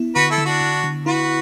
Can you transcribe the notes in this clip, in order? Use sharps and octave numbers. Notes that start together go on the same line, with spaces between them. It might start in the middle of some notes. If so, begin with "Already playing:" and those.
Already playing: B3 E4
D3 F#4 B4
E4 A4
D3
D4 F#4
D3
D3
E4 F#4 B4